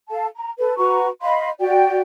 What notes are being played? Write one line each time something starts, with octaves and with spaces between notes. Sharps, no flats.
A4 F5 A5
A#5
A4 B4
F#4 B4 A#5 C#6
D#5 F5 B5 C6
F#4 D5 G5